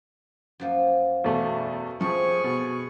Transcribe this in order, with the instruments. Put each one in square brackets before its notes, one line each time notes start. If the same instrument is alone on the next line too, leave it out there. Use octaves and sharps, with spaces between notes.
[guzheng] F#2 F3 A#3
[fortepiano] E2 B2 A3
[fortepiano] F3 [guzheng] A3 C4 [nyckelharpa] G#4 C#6
[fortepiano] B2